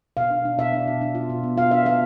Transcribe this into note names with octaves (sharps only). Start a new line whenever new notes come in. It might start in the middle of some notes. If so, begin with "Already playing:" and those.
B2 F5
D4
D4
B2 E5
D4
B2
D4
F4
B2
B3
F4 F5
D4 E5
B3 F5